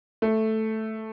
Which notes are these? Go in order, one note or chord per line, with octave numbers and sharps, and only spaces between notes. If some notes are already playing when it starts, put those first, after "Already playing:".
A3